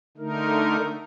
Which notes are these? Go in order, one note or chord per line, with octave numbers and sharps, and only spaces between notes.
D3 A3 D#4 A#4